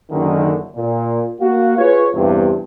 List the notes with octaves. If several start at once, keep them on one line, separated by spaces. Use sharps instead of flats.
F#1 F#2 D3 D#3
A#2
A#3 F#4 F5
F4 G#4 B4 C#5
E2 G2 C3